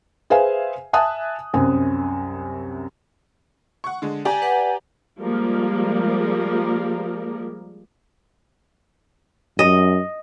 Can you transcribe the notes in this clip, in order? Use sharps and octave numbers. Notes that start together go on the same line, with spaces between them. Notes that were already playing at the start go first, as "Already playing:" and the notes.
G#4 B4 C5 E5 F5 G#5
E5 G#5 A5 D#6 F#6
C2 F#2 C3 C4 G#5
F#5 C#6
D3 G#3
G4 D5 G#5 A#5
B4 F#5
F3 G3 G#3 A#3 A#4
F#2 D#5